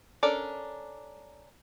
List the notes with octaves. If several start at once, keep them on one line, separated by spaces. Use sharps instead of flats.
C#4 D4 A4 A#4 D5